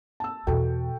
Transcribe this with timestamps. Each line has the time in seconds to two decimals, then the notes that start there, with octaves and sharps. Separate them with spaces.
0.20 A5 E6
0.47 E2 B2 F#4 A4 G5